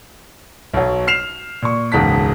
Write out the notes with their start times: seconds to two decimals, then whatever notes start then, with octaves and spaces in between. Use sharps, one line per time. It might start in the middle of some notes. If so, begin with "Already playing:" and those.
0.74 B1 F#3
1.07 F6 C7 E7 F7
1.62 A#2 C#6
1.92 E1 C#2 G#2 A5 B6